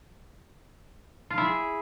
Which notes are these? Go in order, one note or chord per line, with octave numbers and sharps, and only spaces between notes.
F4
E4
G#4